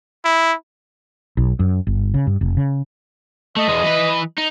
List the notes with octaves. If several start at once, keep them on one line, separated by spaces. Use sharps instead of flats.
E4
B1
F#2
G1
C#3
G2
F1
C#3
A3 D#5
E2 G#3
E3 B4
D#4